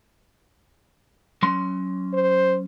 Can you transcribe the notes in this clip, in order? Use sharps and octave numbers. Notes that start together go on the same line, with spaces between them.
F#3 C#4 C6
C5